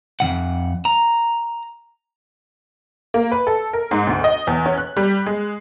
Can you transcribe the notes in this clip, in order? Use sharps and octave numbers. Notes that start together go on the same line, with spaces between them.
F2 D#3 F#5
A#5
A#3
B4
A4
A#4
G#2
D2
D#5
E2
C#4
F#6
G3
G#3